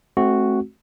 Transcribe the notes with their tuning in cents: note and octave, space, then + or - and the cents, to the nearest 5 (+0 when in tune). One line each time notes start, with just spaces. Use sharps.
A3 -30 C4 +20 F#4 +0